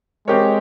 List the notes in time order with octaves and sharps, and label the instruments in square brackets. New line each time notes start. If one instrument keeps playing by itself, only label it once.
[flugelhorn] G#3 [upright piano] C4 G4 A#4 C#5